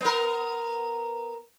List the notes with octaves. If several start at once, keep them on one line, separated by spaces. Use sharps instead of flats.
B3 A#4